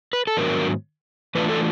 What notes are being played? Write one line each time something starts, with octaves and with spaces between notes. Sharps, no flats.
B4
A4
G#2 D#3 F#3 B3 D4 A#4
E3 A3 D4 F4 B4
A4